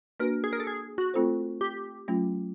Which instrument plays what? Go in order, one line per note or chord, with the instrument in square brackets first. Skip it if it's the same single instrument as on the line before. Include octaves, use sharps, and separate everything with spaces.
[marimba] A#3 D4 F#4 B4 [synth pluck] A#4
[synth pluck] G#4
A#4
A4
G#4
F#4
[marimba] A3 C4 F4 A4 C5
[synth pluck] G4
[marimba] F#3 A3 C#4 F4